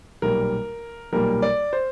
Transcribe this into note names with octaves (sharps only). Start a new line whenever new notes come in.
B1 A#2 G3 A#3 A#4
B1 A#2 G3 A#3 A#4
D5
C5